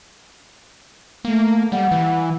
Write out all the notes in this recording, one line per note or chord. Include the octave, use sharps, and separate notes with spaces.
A3 A#3
G3 F#5
E3